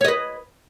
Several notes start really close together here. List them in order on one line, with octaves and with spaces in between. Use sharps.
C#5 D#5 B4